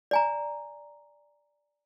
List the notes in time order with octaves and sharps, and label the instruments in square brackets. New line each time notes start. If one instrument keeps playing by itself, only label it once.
[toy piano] D5 G#5 A#5